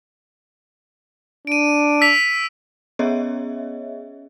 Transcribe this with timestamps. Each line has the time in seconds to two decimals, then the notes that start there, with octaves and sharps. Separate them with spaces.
1.47 D4 D7 D#7
2.01 E6 B6 F7
2.99 B3 C#4 G#4 C#5 D#5 E5